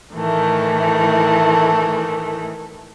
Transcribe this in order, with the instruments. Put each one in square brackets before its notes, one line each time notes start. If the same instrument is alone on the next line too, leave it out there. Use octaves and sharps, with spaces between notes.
[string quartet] A2 D#3 E3 A3